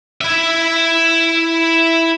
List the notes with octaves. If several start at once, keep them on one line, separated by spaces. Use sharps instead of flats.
E4 E5